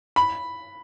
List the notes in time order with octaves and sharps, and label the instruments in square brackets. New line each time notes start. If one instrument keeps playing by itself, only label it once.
[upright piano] B5